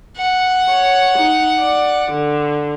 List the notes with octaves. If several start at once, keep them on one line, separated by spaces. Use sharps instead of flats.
F#5
C#5
D#4
D5
D3